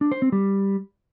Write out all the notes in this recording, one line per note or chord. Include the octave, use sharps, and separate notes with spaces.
D4
C5
C4
G3